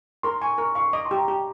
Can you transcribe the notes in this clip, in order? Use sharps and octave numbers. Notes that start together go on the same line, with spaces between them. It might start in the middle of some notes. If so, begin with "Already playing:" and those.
A#4 C6
G#5 C#6
A#4 C#6
F5 C#6
D#5 D6
C6
G4
A#5
G4